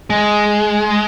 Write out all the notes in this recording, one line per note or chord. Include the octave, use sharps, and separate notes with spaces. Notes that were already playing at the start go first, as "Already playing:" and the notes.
G#3